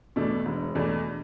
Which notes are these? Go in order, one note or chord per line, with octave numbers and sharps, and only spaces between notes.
E2 B2 A3 D4
E1
E2 B2 A3 D4